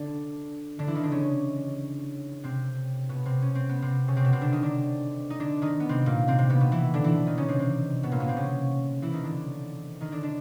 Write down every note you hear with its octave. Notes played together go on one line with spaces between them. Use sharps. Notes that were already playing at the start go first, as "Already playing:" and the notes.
Already playing: D3 D4
D3 D4
E3 E4
D#3 D#4
D3 D4
C#3 C#4
C3 C4
B2 B3
C3 C4
C#4
C4
B3
C3 C4
C#3 C#4
C3 C4
B2 B3
C3 C4
D3 D4
D#3 D#4
D3 D4
D#4
D3 D4
D#3 D#4
B3
C3 C4
A#2 A#3
C3 C4
C3 C4
B2 B3
B2 B3
E3 E4
D3 D4
E3 E4
D#3 D#4
C#3 C#4
C3 C4
C3 C4
B2 B3
A#2 A#3
B2 B3
C3 C4
C#3 C#4
E3 E4
D#3 D#4
D3 D4
D#3 D#4
D3 D4
D3 D4